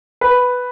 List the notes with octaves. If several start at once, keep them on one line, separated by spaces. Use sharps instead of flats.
B4